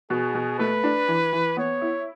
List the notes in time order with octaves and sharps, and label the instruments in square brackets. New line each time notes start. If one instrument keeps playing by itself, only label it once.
[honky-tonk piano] B2 [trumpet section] G#4
[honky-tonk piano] B2
[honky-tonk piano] A3 [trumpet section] B4
[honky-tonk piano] D4
E3
E3
[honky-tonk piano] B3 [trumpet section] C#5
[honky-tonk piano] E4